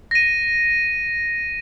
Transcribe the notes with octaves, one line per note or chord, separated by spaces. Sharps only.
A#6 D#7